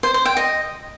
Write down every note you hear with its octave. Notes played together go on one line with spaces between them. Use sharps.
C5
C5
G5
D#5